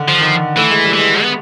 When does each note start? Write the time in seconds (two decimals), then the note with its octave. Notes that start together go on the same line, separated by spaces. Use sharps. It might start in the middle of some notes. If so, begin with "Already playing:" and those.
Already playing: D3 D#3
0.08 F3
0.21 D#3
0.57 E3 A3
0.70 G#3
0.85 G3
0.94 E3 G#3
1.22 B3